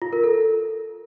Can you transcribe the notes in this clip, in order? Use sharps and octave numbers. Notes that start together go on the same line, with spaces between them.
F4
A#4
A4